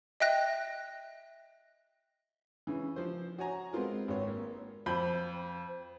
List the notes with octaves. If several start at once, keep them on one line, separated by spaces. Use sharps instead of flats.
D#5 E5 G5 F#6 A#6
C#3 E3
F3 C5
F#4 C#5 G#5 A#5
G#3 B3 C4 F4 A#4
G#1 B3 C#5
A#3
F2 C5 B5 G6